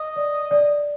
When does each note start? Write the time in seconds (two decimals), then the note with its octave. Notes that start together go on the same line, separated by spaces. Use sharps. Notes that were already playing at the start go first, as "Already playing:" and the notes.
Already playing: D#5
0.16 D5
0.51 D5